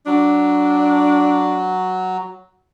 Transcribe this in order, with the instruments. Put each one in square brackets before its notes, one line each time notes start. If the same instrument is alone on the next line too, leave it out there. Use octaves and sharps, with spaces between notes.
[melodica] F#3 [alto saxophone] D4